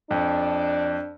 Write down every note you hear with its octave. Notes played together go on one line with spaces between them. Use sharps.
F2 D4